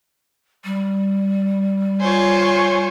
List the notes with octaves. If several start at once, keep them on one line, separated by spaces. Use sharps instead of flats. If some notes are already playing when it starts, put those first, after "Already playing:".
G3
F4 C5 C#5 G#5 C#6